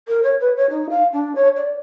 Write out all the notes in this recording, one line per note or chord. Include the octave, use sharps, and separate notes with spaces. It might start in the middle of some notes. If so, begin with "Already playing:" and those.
A#4
C#5
B4
C#5
D#4
F5
D4
C#5
D5